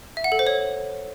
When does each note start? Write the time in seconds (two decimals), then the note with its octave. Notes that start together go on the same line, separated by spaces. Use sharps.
0.17 E5
0.24 F#5
0.32 A4
0.39 C5
0.47 C#5